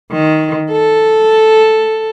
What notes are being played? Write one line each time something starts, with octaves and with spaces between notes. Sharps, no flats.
D#3
A4